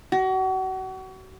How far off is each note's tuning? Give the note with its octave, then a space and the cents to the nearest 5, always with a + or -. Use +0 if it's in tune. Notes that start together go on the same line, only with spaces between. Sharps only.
F#4 +35